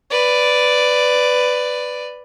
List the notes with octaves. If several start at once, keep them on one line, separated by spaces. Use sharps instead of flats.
B4 D5